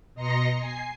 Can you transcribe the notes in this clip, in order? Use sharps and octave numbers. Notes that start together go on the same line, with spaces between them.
B2 D#5 A#5 C6 A#6 C#7
G#5 C7